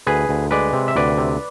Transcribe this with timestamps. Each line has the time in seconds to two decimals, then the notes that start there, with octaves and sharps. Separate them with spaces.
0.07 D2 G#4 B4
0.29 D2
0.51 G#3 B4 D5
0.73 C3
0.88 E5
0.96 D2 B4 D5
1.17 C3